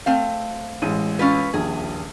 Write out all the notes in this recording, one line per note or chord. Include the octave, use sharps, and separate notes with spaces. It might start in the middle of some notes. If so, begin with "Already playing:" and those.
A3 C4 F5
A1 G#3 D#7
C#4 F4 B4
D#1 A#1 G#4